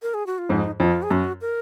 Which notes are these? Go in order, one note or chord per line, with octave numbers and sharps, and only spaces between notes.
A#4
G#4
F#4
F4
F2 G#2 D#4
F2 F4
G#4
F#2 F#4
A#4